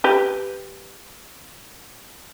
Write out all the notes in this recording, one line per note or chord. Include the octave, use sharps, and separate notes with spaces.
G4 B4